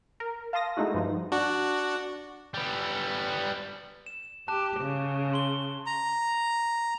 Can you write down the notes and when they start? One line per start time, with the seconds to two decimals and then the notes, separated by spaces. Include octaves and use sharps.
0.20 A#4
0.53 F5 A5 C6 D#6 A#6
0.77 G#3 A3 D#4 E4 F#4
0.94 G2 F3 D#4
1.32 D4 F#4
2.54 G3 B3
4.06 E7
4.48 G4 A5 F#6 E7
4.79 C#3
5.34 C6 G7
5.86 A#5